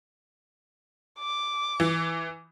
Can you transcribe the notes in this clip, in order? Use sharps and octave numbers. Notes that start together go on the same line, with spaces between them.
D6
E3